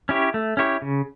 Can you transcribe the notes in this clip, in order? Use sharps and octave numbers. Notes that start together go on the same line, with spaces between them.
C#4 E4 G4 C#5
A3
C#4 E4 G4 C#5
C#3